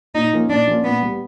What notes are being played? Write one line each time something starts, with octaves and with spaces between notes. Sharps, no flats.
A#2 D#4
F3 A#3 C#4 F4
A#2 D4
F3 A#3 C#4 F4
A#2 B3
G3 B3